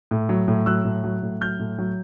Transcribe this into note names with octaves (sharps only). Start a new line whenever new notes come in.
A2
F#3
A2
F#3 E6 F#6
A2
F#3
A2
F#3 F6 G6
A2
F#3